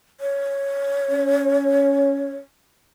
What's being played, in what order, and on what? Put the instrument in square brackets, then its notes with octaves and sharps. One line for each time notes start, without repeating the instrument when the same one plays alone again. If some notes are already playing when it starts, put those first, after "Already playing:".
[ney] C#5
[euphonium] C#4